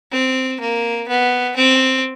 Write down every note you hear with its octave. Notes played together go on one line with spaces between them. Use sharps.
C4
A#3
B3
C4